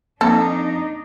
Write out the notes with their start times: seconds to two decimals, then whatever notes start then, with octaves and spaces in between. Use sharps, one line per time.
0.21 F2 A#3 D4 D#4 A4